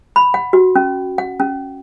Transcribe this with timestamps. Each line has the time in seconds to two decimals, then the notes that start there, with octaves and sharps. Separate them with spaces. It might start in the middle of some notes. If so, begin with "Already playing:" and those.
0.16 B5
0.34 F#5
0.53 F#4
0.76 C#4
1.18 F#5
1.40 C#4